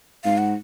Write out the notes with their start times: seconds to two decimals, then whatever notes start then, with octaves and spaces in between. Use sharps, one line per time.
0.25 G#2 F5
0.38 F#5